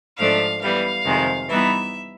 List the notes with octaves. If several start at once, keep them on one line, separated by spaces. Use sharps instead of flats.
G#2 F3 A3 D4 F5
E3 G3 B3 F5
F2 C3 D#3 G#3
E3 G3 B3 D#4 E5